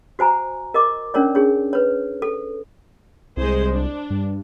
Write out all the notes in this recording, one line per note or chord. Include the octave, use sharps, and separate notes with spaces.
F#4 C5 G#5 A#5
A#4 D#5 D6
C#4 D4 A#4 C#5 D5
D4 G#4 C#5
B4 C#5
A4
C2 G#3 G#4 C5
D4
G2